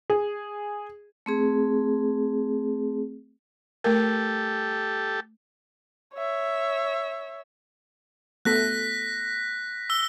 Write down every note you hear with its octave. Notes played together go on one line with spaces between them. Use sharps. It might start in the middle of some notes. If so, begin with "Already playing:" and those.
G#4
A3 C4 G#4
A3 G4 A4 A#4
C#5 E5
A3 B3 A4 F#6 A#6 B6
E6 G7